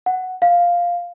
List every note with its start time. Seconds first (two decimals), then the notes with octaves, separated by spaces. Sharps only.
0.06 F#5
0.42 F5